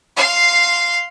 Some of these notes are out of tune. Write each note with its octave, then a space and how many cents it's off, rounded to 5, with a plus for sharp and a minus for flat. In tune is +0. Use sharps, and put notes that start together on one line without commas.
F5 -5 C6 +0